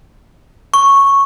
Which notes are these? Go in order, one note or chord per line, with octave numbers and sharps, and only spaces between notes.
C#6